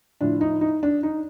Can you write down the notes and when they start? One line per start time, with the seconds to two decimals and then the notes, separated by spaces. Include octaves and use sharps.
0.21 A2 F3 D4
0.41 D#4
0.61 D#4
0.83 D4
1.03 D#4